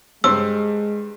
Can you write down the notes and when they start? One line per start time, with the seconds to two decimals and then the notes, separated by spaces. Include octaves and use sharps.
0.24 G2 G#3 C4 C6 E6